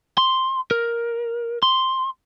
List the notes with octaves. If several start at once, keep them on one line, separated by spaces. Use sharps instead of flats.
C6
A#4
C6